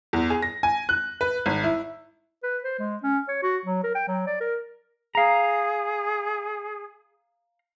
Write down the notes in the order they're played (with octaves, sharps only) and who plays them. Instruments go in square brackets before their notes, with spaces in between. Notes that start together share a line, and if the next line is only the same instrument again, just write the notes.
[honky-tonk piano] E2
G#4
A#6
G#5
F#6
B4
G#1
E4
[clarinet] B4
C5
G#3
C#4
C#5
F#4
F#3
A#4
G5
F#3
D5
A#4
[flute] G#4 [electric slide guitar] F5 A#5